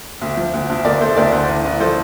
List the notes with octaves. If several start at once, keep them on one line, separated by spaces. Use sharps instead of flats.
D2
F3
D2
D2
D2 A#4 D5
D2 A4 C5
D2 A#4 D5
D2
A1
A1
F3 A4 C5